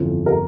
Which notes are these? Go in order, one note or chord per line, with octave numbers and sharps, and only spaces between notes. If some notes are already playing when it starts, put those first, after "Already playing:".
Already playing: G1 F2 E3
A#4